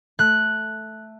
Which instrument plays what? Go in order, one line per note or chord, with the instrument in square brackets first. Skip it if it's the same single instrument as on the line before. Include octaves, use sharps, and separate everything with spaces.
[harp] A3 F#6